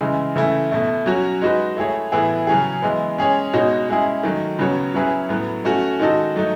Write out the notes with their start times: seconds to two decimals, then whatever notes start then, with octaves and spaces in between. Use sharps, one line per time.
0.01 C#3 E3 G#3
0.36 C#3 E3 A3 E4
0.71 B2 A3 E4
1.06 F#3 C#4 F#4 C#5
1.42 G#3 D#4 F#4 B4
1.77 A3 E4 G#4 C#5
2.12 A2 E3 B3 E4 G#4
2.47 C#3 F#3 C#4 G#4
2.82 E3 G#3 B3
3.18 G#3 C#4 G#4 C#5
3.53 B2 G#3 D#4 F#4 C#5
3.89 G#3 C#4 E4 G#4
4.23 D#3 F#3 A3
4.59 C#3 F#3 B3 F#4 C#5
4.94 F#3 C#4 E4 G#4 B4
5.29 A2 F#3 B3
5.65 A3 C#4 F#4
5.99 D#3 G#3 D#4 F#4 A4
6.36 F#3 A3 D#4